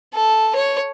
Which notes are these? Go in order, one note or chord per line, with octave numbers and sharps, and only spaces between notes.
A4
C#5